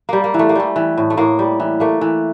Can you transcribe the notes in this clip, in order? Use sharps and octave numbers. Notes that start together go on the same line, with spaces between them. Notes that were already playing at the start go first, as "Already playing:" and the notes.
G3 A#3
A#3
E3
A3
A#3
G3 A3
E3
A2
A3
A2 A#3
G3
E3
A3 A#3
E3